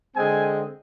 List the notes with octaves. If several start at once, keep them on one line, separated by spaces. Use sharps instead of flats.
D3 G#3 C4 G#5